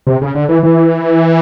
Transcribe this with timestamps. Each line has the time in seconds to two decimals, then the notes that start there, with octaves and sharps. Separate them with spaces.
0.07 C3
0.21 C#3
0.35 D3
0.49 E3
0.63 E3